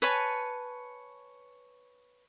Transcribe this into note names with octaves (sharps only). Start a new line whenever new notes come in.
B4 C#5 G#5 A5